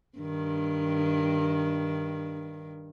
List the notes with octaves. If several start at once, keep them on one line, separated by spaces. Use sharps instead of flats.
G2 D#3